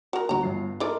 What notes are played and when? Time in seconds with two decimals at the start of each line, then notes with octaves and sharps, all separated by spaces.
0.13 F#4 A#4
0.29 G1 D2 D3 F#4 A#5
0.43 G1 G2 C7
0.80 G#3 A3 D#4 A#4 D5